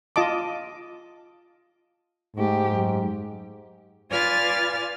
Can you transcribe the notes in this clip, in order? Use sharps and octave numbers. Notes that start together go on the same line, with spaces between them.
F4 D#5 A5 D6
G#2 A3 G4
F#2
F4 B4 D5 G#5 F6 A6